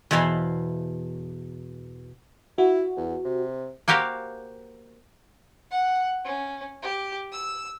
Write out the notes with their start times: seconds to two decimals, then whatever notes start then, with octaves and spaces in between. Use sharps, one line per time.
0.11 E2 B2 E4 C5 F5 B5
2.58 E4 F#4
2.97 E2
3.25 C3
3.88 A#3 F#4 G4 A#4 C5 F5
5.71 F#5
6.24 C#4
6.82 G4
7.32 E6